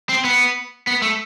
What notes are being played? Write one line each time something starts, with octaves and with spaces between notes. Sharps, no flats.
C4
B3
B3
A3